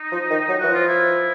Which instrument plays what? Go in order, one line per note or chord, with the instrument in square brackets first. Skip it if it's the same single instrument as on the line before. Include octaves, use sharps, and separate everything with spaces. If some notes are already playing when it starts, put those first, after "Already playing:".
Already playing: [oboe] D#4
[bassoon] F3
D#3
F#3
[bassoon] E3 [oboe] F#4
[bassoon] F3
[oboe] F4
E4